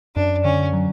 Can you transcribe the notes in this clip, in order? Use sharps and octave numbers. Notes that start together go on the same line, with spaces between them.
F#2 D4
D3 C#4
F#3